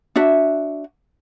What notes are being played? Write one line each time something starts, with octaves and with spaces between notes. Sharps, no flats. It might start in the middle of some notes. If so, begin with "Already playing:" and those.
D4 F#4 E5